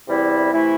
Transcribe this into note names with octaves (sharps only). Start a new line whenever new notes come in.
E2 C3 G3 C4 E4
C3 E3 A3 E4